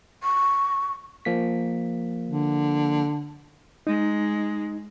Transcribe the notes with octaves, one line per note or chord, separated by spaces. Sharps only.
C#6
F3 A#3 B6
D3
G#3 D#4